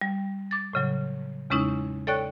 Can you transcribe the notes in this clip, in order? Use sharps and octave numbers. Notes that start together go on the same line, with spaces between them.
G3
D6 A6
A2 C#3 F#3
E2 C#3 G#3 C#4 D#4 E4
A4 C#5 D5 G5 C#6 F#6